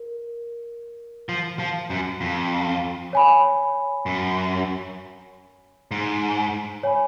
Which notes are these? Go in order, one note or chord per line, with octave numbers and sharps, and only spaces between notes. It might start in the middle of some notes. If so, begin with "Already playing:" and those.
Already playing: A#4
F3
F3
F#2
F2
C#5 G#5 B5
F#2
G#2
C#5 G#5 B5